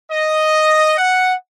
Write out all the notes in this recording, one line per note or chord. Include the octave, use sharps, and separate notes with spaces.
D#5
F#5